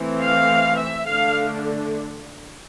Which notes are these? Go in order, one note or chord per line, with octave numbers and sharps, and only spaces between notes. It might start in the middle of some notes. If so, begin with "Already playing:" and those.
Already playing: E3 A3 C4
F5
E5
D3 A3 D4 F5